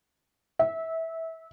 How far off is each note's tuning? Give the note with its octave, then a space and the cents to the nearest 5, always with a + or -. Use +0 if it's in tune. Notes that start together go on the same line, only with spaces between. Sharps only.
E5 -20